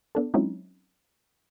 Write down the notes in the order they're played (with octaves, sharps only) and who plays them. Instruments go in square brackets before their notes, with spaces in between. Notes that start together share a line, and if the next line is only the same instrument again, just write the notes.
[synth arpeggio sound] B3 D4 A4
F#3 G#3 C4 C#4 D#4 E4